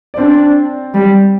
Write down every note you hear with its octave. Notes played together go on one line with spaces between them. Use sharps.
D5
C4 D4 C5
G3